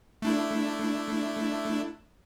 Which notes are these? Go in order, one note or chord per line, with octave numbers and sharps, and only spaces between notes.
A3 D4 E4